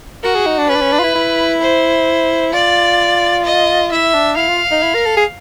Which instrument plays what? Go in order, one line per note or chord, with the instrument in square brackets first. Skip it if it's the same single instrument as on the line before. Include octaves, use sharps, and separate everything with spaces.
[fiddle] F#4 [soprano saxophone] A#4
[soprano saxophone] G#4
D#4
D4
[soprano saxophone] C#4 [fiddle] B4
[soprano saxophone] D4
C#4
D4
F4
E4
E4
[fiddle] C5
[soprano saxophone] F4 [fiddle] D5
[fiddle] D#5
[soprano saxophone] E4 [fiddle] E5
[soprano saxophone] D4
[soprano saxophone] E4 [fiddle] F5
[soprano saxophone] F4
D#4
E4
A#4
A4
G#4